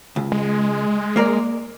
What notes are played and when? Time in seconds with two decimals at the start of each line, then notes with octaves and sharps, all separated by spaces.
0.16 C#2
0.32 G#3
1.16 A#3 A#4 D5